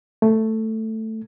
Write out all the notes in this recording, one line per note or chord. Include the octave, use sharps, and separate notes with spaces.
A3